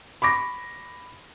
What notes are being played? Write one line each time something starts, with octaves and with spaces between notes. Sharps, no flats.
B5 C#6 D6 A#6